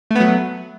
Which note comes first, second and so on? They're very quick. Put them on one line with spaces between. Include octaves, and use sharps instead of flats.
A3 B3 F#3